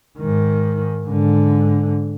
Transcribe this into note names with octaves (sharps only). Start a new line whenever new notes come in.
G#2 D#3
G#2 D3